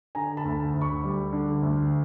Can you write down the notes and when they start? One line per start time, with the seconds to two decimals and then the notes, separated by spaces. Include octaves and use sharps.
0.15 D3 G#5 A#5
0.37 A5 B5
0.45 D2
0.74 D2
0.81 B5 C#6
1.04 G3
1.33 D3
1.62 D2